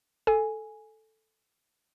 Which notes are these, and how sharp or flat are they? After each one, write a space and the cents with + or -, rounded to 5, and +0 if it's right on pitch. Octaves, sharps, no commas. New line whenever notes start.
A4 +0 G#5 +0